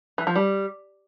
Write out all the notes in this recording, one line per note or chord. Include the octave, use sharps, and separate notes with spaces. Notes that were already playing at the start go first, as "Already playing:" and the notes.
E3
F3
G3